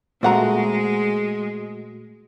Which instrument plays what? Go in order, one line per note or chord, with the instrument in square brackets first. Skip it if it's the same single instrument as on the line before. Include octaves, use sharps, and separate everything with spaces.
[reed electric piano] A#2 A3 F#4 [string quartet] G#3 [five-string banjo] C4 F#5 A#5